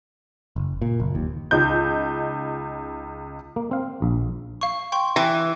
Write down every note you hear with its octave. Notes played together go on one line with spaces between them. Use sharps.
F#1
A#2
F#1
D#2
C#2 D#4 G6
A#3
C4 F5
A#1
F5 C#6
G5 C6 C#6
E3 G5